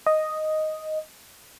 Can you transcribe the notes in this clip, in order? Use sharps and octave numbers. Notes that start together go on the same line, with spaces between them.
D#5